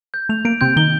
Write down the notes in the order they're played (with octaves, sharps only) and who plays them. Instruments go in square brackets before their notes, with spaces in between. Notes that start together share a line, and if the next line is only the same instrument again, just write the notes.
[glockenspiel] G6
[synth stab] A3 [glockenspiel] F7
[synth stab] A#3 [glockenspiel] D7
[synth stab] C3 C4 [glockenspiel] G6
[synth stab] D#3 D#4 [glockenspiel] G7